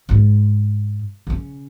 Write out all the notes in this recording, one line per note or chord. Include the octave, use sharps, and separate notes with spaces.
G#2 F4
C#3 C#4